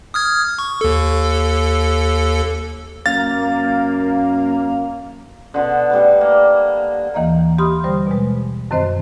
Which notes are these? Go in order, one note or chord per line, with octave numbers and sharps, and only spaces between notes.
D#6 F6 G#6
C#6
D#2 A4
F#2 A#3 F5 A6
B2 D3
G3 A3 B4
A#3
D#2 E3 A#3 D#5 F5 A#5
G4 B5 C6 D#6 F6
D3 G3 C5
B2 G#3
F#2 D#3 C4 C5 D#5